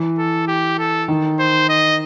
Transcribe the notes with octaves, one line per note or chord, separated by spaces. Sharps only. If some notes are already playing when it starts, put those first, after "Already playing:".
Already playing: E3
A4
G4
A4
D#3
C5
D#5